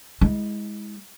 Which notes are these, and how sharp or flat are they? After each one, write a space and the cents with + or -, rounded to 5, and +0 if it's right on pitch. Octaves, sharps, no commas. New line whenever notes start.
G#3 +0 E4 -30